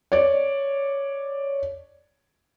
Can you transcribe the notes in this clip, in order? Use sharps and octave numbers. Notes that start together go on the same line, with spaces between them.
C#5 D5